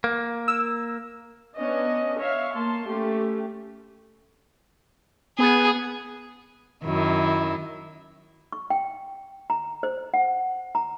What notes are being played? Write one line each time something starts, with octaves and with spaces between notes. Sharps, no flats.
A#3
E6
B3 C#4 D4 D#5
C#5 E5 F5
A#3 A5 C6
A3 C#4 G4
B3 G#4
F#2 D#3 E4
C#6
G5
A#5
C5
F#5
A#5